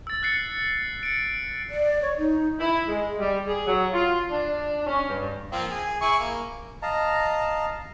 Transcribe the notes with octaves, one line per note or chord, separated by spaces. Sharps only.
E6 A6
F#6 A6 C7 C#7
C#7 D7
D5
C#5
D#4
E4
G#3
G3
G#4
F#3
F4
D4
C#4
G2
F3 A#3 C4
G#4
E4 G#4 C#6
A#3
D#5 F5 A5 A#5